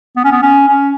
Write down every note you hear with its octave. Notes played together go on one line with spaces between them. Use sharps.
B3
C#4
B3
C#4
C#4